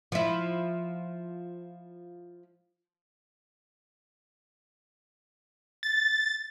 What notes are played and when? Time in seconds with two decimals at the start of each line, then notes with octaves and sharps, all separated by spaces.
0.12 F3 E4
5.83 A6